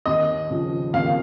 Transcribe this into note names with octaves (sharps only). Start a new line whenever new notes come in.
D#2 D#5
C#3 F3
D#2 F5